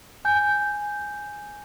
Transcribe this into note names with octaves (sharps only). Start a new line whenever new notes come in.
G#5 G6